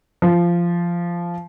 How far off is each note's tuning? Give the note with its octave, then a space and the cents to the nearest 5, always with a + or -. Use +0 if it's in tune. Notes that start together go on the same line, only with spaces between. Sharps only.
F3 -15